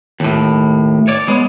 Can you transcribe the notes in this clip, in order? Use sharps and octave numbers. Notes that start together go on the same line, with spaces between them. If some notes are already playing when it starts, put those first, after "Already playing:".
D#2 A2
C#5 D5
G#3 B3